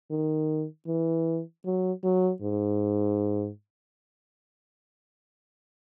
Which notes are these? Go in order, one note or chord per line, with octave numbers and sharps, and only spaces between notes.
D#3
E3
F#3
F#3
G#2